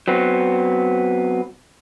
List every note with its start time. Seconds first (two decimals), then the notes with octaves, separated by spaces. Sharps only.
0.08 F#3 B3 C4